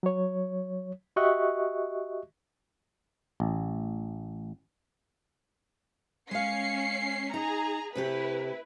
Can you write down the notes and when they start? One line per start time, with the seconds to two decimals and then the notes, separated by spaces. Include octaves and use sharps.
0.03 F#3 C#5
1.16 F#4 G4 D#5 E5 C#6 F#6
3.40 A1
6.31 G#3 C#4 F5 C7 C#7
7.34 D#4 G#4 A#5
7.95 C3 A3 E4 G4 B4